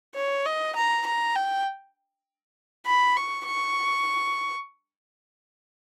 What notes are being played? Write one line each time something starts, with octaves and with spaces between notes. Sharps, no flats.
C#5
D#5
A#5
A#5
G5
B5
C#6
C#6